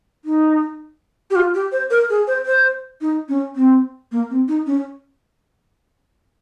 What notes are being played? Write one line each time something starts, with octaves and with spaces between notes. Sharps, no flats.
D#4
G4
F4
G4
C5
A#4
G#4
C5
C5
D#4
C#4
C4
A#3
C4
D#4
C#4